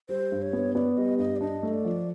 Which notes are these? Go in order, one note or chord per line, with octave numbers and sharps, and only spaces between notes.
G3 C5
G2
C#5
B3
B3 D5
G3 D#5
G2 D#5
D5
D4 D#5
A3
D5
F3